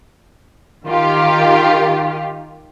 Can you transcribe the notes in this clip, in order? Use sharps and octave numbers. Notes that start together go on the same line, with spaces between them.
D#3 F4 G4